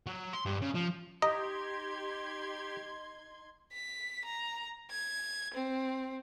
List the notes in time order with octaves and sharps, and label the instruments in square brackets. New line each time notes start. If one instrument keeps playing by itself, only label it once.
[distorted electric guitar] F#3
C6
G2
C#3
F3
[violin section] D#4 C6 G#6 [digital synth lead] G4 [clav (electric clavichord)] D#5 [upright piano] A#5
[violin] B6
A#5
G#6
C4